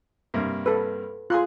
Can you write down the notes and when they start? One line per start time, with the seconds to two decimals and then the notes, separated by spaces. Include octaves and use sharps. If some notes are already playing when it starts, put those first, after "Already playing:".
0.34 G2 C3 A#3
0.66 A4 B4
1.30 F4 G#4 C6 F#6